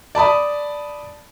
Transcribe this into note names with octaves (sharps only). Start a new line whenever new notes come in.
D5 A5 B5 D#6